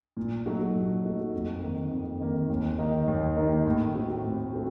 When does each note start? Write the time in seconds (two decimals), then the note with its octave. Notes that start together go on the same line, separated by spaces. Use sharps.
0.17 A#2
0.46 F#3 A3 D#4 F#4
0.75 A#2
1.04 F#3 A3 D#4 F#4
1.33 F2
1.62 D#3 A#3
1.91 F2
2.20 D#3 A#3
2.49 D#2
2.78 D#3 A#3 D#4
3.08 D#2
3.37 D#3 A#3 D#4
3.66 A2
3.95 A3 C4 F#4
4.24 A2
4.53 A3 C4 F#4